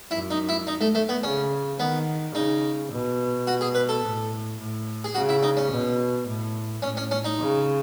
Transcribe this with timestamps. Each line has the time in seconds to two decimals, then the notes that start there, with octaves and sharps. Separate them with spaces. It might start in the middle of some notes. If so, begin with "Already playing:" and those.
0.11 F#2 E4
0.31 D#4
0.49 E4
0.67 D#4
0.81 A3
0.95 A3
1.09 B3
1.23 C#3 C#4
1.79 D#3 B3
2.35 C#3 D#4
2.91 B2
3.47 F#4
3.61 G#4
3.75 B4
3.89 A4
4.03 A2
4.59 A2
5.04 G#4
5.15 C#3 F#4
5.29 E4
5.43 D#4
5.57 C#4
5.71 B2
6.27 A2
6.82 A2 C#4
6.97 C#4
7.11 C#4
7.25 D#4
7.39 C#3